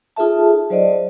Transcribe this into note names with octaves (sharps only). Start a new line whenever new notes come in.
D#4 F4 G#4 A4 E5 A5
F#3 C5 D5 D#5